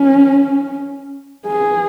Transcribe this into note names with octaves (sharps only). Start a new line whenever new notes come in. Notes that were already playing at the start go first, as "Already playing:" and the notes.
Already playing: C#4
G#4